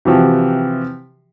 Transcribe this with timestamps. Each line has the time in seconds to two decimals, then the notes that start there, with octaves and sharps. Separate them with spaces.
0.05 C3 E3 F3 F#4 G4